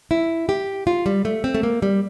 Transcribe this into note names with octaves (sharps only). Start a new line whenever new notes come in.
E4
G4
F4
G3
A3
C4
A3
A#3
G3